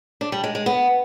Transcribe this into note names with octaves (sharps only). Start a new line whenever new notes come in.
D4
G3
G#3
G#3
B3